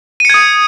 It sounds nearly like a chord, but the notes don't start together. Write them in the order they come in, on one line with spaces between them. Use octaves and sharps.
D#7 C#7 G#6 D#6